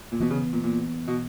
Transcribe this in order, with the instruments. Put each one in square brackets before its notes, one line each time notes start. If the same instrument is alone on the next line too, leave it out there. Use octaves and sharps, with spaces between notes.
[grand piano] A#2
[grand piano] B2 [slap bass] E3 B3
[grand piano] C#3
A#2
A#2
B2